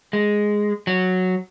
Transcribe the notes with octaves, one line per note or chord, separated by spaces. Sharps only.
G#3
F#3